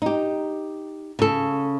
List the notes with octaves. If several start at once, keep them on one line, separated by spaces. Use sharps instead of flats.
D#4 G4
C#3 A4